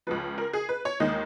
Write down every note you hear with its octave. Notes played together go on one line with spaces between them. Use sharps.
C#2 C#3 F3 B4
A#4
G#4
B4
C#5
D#2 D#3 G#3 D#5